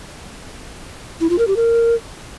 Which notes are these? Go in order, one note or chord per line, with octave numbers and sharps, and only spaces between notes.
E4
F4
A#4
G4
A#4